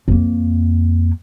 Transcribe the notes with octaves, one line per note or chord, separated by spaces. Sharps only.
F2 A#3